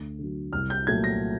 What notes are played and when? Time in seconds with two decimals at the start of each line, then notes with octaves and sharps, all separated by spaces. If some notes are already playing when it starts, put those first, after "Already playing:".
Already playing: D2
0.19 D3 F#3
0.53 C2 F6
0.70 G6
0.87 A#2 F#3 A3 G#6
1.04 A#6